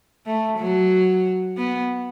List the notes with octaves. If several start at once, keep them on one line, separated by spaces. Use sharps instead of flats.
A3
F#3
B3